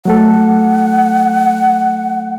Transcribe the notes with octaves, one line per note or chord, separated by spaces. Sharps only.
F#3 A3 A4 F#5